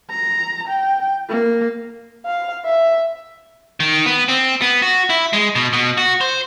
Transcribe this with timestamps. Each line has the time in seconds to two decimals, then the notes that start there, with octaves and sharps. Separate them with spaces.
0.11 A#5
0.67 G5
1.29 A#3
2.26 F5
2.66 E5
3.80 D#3
4.06 B3
4.28 C4
4.62 B3
4.82 F#4
5.10 E4
5.33 G#3
5.55 B2
5.73 B2
5.98 F#4
6.21 C5